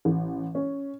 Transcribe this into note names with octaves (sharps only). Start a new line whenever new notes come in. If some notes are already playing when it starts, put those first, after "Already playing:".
A1
C#4